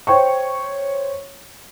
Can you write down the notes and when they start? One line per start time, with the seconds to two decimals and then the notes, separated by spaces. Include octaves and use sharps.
0.07 C5 C#5 G5 C#6